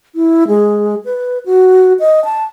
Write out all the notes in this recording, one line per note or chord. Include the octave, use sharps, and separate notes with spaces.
E4
G#3
B4
F#4
D#5
A5